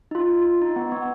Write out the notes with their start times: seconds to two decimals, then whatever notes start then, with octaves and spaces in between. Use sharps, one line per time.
0.11 D#4
0.15 F4
0.61 D#4
0.76 B3
0.92 B3